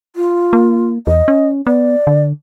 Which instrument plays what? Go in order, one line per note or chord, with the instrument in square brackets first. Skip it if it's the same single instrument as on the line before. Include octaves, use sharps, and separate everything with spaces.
[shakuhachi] F4
[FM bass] A#3
[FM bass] E2 [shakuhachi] D#5
[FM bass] C#4
[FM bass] B3 [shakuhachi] D5
[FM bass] D3